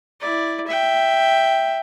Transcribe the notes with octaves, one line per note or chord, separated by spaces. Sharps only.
E4 D5
E5 G5